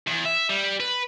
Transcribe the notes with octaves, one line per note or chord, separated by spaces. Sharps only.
E2
E5
G3
B4